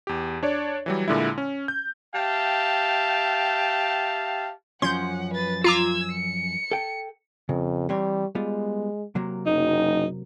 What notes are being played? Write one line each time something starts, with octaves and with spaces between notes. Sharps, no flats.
E2 G4
D4 C#5 D5
E3 F#3 G3
A#2 D3 G#3 E4
C#4
G6
G4 E5 F5 G5 A5
F#2 F3 C#4 F#5 C6 G6
B4 A6
F4 A#5 D6 E6 G#6
C#7
A4 G5
F2 C#3
E3 G3 C4 C#5
G3 G#3 B3 F4
C3 F#3 A#3
F#1 D#4